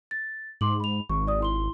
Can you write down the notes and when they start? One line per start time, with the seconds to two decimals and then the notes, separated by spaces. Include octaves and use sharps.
0.11 A6
0.61 G#2 C6 D6 F#7
0.80 B5 F7
1.09 G#1 C#6
1.27 D5 D#6
1.40 E4 C6 G7